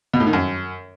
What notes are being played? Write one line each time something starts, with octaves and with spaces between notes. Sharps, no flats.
B2
A2
D#3
F#2